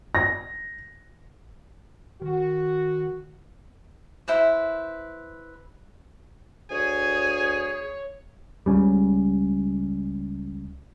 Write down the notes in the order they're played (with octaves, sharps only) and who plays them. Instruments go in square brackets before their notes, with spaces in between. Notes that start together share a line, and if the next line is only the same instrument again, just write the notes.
[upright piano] A#6
[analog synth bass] D#3 [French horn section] F#4
[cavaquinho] E4 B4 C5
[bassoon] D2 [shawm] G#4 [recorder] C#5 [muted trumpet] G#5
[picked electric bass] C#2 C#3 G3